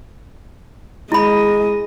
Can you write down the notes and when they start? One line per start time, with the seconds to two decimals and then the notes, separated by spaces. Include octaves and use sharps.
1.12 G#3 E4 D#5 B5